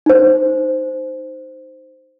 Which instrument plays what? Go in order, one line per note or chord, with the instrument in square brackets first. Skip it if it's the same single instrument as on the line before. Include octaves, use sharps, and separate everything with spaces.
[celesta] D#4 C5